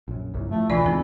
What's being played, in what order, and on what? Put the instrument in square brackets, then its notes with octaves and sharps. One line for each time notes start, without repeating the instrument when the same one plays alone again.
[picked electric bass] A#1 F#2
G1 C2 F#2
[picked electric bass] A2 F3 [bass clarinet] A3
[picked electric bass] E1 C#2 [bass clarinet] E3 [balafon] D4 F4 D5
[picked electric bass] E2 D#3 G#3 [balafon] C4